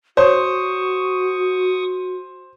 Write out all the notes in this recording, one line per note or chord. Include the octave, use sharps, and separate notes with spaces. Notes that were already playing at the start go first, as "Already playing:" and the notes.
F#4 C5 C#5 C#6 D#6